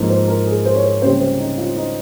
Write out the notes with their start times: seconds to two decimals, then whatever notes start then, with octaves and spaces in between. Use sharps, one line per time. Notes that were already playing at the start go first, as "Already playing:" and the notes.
Already playing: G#2 F3 A#3
0.10 C5
0.28 A#4
0.47 G#4
0.65 C5
0.75 C#5
0.84 C5
1.02 C#2 C3 G3 A#3 C#4 C5
1.21 C5
1.39 D#4
1.57 F4
1.76 D#4